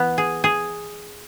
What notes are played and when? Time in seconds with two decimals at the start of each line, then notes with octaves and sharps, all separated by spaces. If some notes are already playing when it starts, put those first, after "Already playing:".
Already playing: E3 B3
0.18 G#4
0.44 G#4